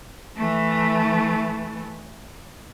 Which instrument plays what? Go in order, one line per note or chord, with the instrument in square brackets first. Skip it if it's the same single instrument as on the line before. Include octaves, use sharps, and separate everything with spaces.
[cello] E3 A3